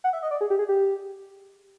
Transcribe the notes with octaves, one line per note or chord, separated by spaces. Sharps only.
F#5
E5
D#5
D5
G#4
G4
G#4
G4